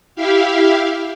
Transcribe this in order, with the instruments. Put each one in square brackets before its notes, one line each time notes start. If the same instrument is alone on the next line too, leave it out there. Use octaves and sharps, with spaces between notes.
[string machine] E4 G4 E5 F5